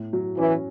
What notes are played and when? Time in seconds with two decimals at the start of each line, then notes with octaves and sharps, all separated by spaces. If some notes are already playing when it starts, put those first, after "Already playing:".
Already playing: A2
0.13 F#3
0.38 E3 C#4